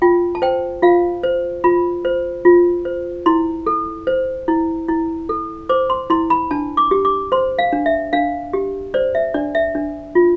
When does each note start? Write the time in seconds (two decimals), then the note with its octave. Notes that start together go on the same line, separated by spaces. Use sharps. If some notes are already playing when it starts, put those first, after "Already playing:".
0.02 F4 G5
0.35 A5
0.42 C5 G5
0.82 F4 F5
1.23 C5
1.64 F4 B5
2.05 C5
2.45 F4
2.85 C5
3.26 E4 C6
3.66 A4
4.07 C5
4.48 E4
4.88 E4
5.29 A4
5.69 C5 D6
5.90 C6
6.10 E4 C6
6.30 B5
6.51 D4 A5
6.77 D6
6.91 G4
7.05 D6
7.32 C5 C6
7.59 F5
7.73 D4
7.86 E5
8.13 D4 F5
8.53 G4
8.94 C5 D5
9.15 E5
9.34 D4 D5
9.55 E5
9.75 D4
10.15 F4